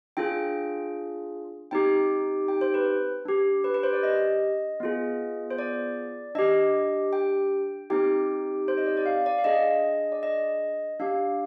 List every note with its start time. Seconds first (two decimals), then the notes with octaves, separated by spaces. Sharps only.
0.17 D4 F4 G#4 G5
1.71 C4 D#4 G4 G5
2.48 G5
2.61 C5
2.74 B4
3.25 D4 G4
3.64 B4
3.74 B4
3.83 C5
3.93 D5
4.03 D#5
4.80 B3 F4 G#4
5.51 C5
5.58 D5
6.35 D4 G4 D#5
7.13 G5
7.90 C4 D#4 G4 G5
8.68 C5
8.77 D#5
8.86 D5
8.97 D5
9.06 F5
9.26 D5
9.38 F5
9.44 D4 G#4 D#5
10.12 D5
10.23 D#5
11.00 D4 G4 F5